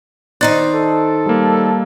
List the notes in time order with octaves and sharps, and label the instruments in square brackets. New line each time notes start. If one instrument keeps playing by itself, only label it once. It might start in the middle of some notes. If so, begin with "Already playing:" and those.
[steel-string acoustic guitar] D#3 D#4 C5 [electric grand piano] D5 F#6 A6
[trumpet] A4
[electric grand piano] G3 A#3